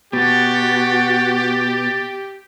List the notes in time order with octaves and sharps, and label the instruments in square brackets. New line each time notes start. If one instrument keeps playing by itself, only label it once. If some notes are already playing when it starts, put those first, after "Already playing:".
[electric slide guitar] B2 [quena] F#4 [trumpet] G4 [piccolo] A6